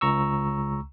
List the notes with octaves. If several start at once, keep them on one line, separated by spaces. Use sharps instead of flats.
C#2 A#5 C#6 E6